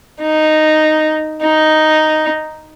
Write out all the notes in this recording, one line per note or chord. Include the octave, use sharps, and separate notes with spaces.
D#4
D#4